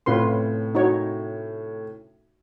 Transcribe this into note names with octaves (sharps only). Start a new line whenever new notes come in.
A2 C3 C#4 F4 B4 C6
D#4 F#4 C#5